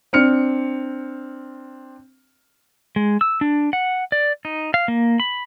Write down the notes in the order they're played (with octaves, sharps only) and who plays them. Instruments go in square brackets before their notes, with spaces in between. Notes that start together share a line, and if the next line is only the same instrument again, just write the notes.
[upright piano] C4 D4 F6 C#7
[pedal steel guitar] G#3
E6
D4
F#5
D5
D#4
F5
A#3
B5